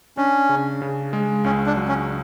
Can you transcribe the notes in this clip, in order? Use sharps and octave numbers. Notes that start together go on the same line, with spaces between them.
C#4 D4
C#3
C#3
G#3
C#2 C#4
D4
F#3
C#4